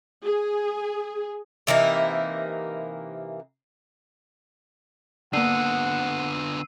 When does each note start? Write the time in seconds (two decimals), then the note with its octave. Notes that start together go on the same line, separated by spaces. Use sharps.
0.25 G#4
1.67 C3 E3 A#3 D#4
5.33 D3 A#3 B3 D4 F#5 E6 C7 D#7